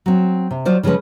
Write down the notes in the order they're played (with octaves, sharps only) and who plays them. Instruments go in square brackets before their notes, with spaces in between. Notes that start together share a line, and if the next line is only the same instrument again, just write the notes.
[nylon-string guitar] F#3 C4
C3
F#3 F4 C5 D5
C#3 F3 G#3 C#4 B4